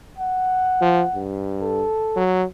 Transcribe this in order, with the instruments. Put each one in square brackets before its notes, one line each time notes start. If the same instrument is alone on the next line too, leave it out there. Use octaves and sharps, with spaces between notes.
[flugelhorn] F#5
[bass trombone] F3
G2
[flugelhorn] A4
[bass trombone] F#3